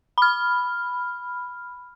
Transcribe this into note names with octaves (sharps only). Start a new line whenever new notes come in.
B5 F6